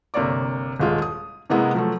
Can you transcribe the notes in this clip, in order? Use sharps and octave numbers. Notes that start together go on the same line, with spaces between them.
G1 C3 A#3 C#5 D5 D6
D#1 G#3 F4
D#6
C3 E3 G#3 A#3 B3 E4
F3 F#3 A3